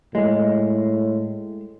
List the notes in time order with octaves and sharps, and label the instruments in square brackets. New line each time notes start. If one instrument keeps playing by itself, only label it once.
[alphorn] A2 [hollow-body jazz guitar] G#3